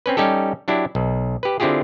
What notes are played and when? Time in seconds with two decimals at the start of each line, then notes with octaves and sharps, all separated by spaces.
0.06 C4 C#4 B4
0.17 G3 C#4 D#4 G4 A4
0.68 F#3 D4 E4 G4
0.95 B1
1.43 G4 B4
1.60 D3 C4 E4 F4 G4 G#4